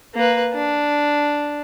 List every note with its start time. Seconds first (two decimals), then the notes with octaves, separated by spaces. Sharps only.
0.14 A#3 B4
0.54 D4